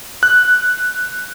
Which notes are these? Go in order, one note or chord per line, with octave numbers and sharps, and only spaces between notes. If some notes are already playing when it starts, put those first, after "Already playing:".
F#6